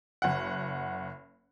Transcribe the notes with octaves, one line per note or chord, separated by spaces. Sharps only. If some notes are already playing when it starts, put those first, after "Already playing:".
F#1 F#5